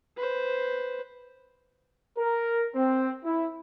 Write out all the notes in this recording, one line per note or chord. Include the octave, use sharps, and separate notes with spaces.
B4 C5
A#4
C4
E4